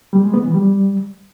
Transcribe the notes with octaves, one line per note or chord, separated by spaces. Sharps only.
G3
G#3
B3
E3
G3